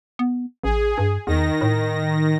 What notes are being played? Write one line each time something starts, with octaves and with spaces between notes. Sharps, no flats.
B3
A1 G#4
G2
E2 D#3 A#6
A2